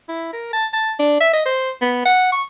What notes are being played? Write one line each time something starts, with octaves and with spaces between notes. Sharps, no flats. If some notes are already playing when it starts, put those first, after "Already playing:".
E4
A#4
A5
A5
D4
E5
D#5
C5
B3
F#5
C#6